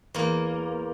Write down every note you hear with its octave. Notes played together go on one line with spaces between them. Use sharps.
E2 A#3